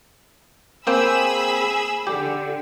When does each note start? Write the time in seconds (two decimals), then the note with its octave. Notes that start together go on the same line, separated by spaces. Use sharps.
0.87 A#3 C4 G#4 G5 B5 E6
2.07 D3 G4